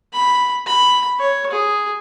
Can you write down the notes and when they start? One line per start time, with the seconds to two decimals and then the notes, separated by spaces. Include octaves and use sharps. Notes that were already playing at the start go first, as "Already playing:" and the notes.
0.13 B5
0.66 B5
1.19 C#5
1.51 G#4